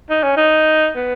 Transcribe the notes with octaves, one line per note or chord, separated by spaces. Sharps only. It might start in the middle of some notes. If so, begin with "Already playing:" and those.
D#4
C#4
D#4
B3